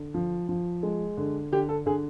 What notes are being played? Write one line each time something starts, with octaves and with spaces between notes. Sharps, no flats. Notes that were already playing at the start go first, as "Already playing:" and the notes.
Already playing: D3
F3
F3
G#3
D3
D3 G4
A4
D3 G#4